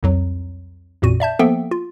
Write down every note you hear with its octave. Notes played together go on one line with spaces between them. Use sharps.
C2 F2 F#3
A1 F2 A#2 F#4 D#7
D5 E5 A5 G6
F3 A#3 B3 A4 E5 G5
F4